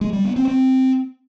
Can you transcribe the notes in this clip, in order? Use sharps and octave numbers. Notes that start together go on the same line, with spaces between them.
G#3
G3
B3
C4
C4